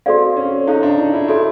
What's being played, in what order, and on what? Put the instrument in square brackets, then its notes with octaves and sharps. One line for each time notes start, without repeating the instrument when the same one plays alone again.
[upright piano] C4 [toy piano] F#4 A4 D5 F5
[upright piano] C#4
[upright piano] D#4 [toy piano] E4 A4 C5 F5
[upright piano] D4
D#4
E4
[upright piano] E4 [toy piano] F#4 A4 C#5